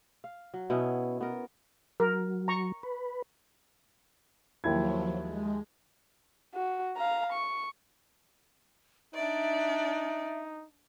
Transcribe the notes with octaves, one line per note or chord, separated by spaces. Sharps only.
F5
F#3
B2 B3 C#4 E4
B3 A#4
F#3 A#4
A#5 C#6
B4
D#2 F3 F#3 E4 G#6
G#3
F#4
F5 A#5
C#6
D4 D#4 D5 E5